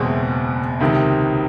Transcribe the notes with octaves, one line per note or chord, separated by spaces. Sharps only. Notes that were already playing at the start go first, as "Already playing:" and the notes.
Already playing: F#1 E2 B2 G#3 C4
C#2 C3 D#3